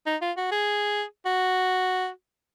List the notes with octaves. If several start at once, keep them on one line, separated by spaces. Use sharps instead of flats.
D#4
F4
F#4
G#4
F#4